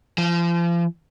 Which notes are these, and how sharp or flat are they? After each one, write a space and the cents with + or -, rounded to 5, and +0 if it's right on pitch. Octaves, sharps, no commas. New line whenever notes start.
F3 -35